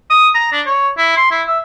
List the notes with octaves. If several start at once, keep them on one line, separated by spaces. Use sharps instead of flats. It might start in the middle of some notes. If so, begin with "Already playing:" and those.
D#6
A#5
D4
C#5
E4
C6
E4
E5